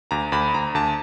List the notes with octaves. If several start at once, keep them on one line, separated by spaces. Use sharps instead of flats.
D2 A#5
D2 B5
D2 A#5
D2 A5